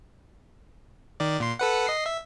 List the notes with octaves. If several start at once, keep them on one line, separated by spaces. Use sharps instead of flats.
D#3 D5
A#2 C6
A4 B4 F#5
D#5 C7
E5